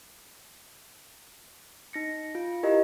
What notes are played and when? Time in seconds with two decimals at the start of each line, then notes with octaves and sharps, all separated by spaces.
1.93 D#4 A#6 C#7
2.35 F4
2.63 E4 G4 A#4 D#5